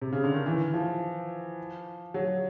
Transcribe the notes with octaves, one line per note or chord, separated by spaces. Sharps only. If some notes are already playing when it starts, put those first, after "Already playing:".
C3
C#3
D3
D#3
E3
F3
F#3